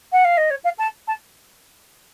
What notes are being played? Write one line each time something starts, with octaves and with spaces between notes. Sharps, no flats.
F#5
F5
D#5
C#5
F5
A5
A5